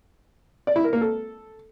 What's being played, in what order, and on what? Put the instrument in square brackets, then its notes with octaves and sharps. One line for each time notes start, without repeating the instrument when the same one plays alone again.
[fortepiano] D5
E4
A#4
A#3
A4